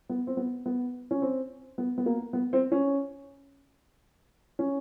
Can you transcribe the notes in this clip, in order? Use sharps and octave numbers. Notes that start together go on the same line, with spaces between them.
B3
C4
B3
B3
C#4
C4
B3
B3
A#3
B3
C4
C#4
C#4